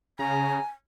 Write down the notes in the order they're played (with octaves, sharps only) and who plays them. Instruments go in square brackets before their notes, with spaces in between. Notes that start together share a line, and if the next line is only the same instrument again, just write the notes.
[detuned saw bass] C#3 [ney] G#5 [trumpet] A#5